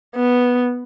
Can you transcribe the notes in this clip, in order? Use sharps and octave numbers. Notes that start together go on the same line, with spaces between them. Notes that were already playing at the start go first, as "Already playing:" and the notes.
B3